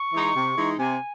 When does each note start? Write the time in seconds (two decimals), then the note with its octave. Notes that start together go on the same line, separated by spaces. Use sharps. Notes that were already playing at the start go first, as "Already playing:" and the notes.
Already playing: C#6
0.13 E3 G#3 D#4
0.35 C3
0.57 E3 G#3 D#4
0.79 C3 G#5